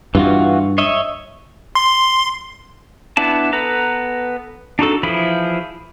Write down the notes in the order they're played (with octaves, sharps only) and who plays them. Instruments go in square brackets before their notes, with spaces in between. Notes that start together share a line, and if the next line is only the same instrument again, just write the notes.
[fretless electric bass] G2 [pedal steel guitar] E3 F4 F#4
[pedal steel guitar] C#5 D#5 E5
[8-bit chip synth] C6
[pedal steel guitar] B3 D4 E4 A5
B3 A4 B4 A#5
D4 D#4 F#4 A4
E3 F3 E4 G#4 B5